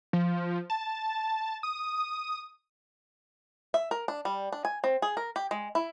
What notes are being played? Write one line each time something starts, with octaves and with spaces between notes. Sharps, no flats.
F3
A5
D#6
E5
A#4
D4
G3
D4
G#5
C4
G#4
A#4
G4
G#3
E4